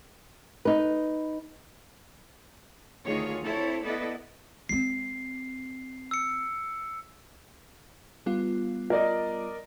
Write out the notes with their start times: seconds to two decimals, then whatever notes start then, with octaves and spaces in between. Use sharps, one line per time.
0.65 D#4 B4
3.06 D2 D#3 F4 G#4 C#5
3.44 C4 E4 A4 C#5
3.84 B3 E4 A4 B4 D5 D#5
4.69 G#3 C4 C7
6.11 E6 C#7
8.26 G3 B3 F4
8.90 A#4 D5 D#5